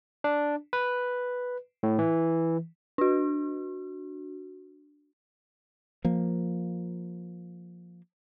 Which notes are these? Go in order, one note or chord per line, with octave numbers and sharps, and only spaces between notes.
D4
B4
A2
E3
D4 F#4
F3 A#3